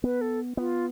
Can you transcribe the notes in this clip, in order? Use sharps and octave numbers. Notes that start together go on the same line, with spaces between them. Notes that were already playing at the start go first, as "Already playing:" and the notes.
B3 B4
A4
B3 F4